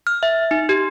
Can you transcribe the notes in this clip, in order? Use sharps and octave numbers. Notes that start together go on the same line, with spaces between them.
F6
E5
D#4
G4